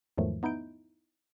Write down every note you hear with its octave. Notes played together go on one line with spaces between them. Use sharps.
E2 G#2 D#3 F3 F#3 A3
B3 D#4 E4 G6 D7